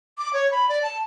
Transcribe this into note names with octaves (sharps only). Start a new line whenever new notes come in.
D6
C#5
B5
D5
A5